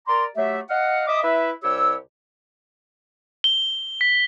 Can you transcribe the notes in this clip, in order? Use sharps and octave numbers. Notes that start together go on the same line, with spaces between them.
A#4 D5 A#5 C6 D6
F#3 A3 G4 E5
D#5 F5 F#5
D#5 E5 D6 D#6
E4 B4 E5
C2 G4 C#5 E6
G7
B6